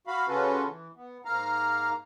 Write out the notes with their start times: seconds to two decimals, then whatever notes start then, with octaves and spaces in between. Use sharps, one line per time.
0.07 F#4 F5 B5
0.28 C#3 C#4 F4 F#4 A4 B4
0.67 E3
0.96 B3
1.25 G#2 A#3 F5 A#5 F6